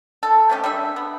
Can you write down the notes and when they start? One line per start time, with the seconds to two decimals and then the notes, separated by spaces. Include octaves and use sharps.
0.23 A4
0.50 A3 C4 C#4 G4
0.64 G3 D4 E5
0.96 B3